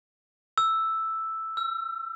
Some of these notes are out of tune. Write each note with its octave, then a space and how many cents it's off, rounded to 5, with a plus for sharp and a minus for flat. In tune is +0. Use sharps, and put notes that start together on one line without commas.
E6 +0
E6 +40